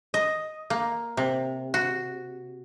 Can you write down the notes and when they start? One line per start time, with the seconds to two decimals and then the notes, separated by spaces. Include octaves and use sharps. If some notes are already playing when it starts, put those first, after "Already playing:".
0.14 D#5
0.70 A#3
1.17 C3
1.74 F#4